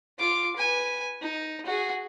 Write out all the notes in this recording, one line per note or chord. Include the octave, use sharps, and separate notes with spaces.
F4 D6
B4 G#5
D#4
F#4 G#4